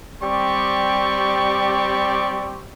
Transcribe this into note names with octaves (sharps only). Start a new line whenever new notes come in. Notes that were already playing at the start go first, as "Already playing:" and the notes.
G3 C4 G4 D5 C#6